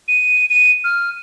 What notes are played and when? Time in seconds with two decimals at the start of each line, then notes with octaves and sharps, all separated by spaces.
0.08 D#7
0.50 D#7
0.84 F6